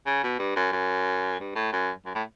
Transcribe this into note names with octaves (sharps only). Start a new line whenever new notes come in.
C#3
B2
G2
F#2
F#2
G2
A2
F#2
F#2
A2